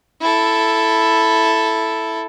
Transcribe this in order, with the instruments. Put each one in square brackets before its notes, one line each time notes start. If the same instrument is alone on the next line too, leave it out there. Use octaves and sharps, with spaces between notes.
[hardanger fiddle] E4 A4